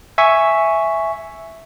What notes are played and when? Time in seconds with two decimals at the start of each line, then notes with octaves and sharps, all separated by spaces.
0.18 E5 G#5 C#6